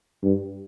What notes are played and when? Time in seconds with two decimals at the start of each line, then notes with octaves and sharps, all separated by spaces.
0.23 G2